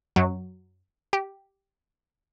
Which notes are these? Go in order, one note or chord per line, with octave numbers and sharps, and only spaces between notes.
F#2 F#3
G4